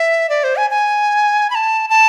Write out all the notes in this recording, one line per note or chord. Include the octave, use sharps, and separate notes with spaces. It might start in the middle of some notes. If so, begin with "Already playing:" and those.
Already playing: E5
D5
C5
G#5
G#5
B5
A5
A5